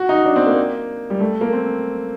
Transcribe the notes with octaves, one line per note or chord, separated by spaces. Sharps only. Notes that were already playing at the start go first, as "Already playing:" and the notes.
Already playing: F#4
D#4
D4
C4
A#3
G3
A3
A#3
C4